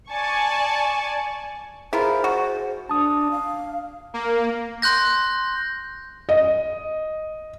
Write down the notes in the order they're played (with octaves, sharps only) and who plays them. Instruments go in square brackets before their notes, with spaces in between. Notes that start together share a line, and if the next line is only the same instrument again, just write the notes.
[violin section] D5 G#5 A5 C#6
[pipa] E4 F4 A#4 [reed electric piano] G#4 [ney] C5
[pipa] F#4
[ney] D4 [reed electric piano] A5 D#6
[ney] F5
[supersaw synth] A#3
[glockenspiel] C6 F#6 G6 A#6
[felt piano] D#5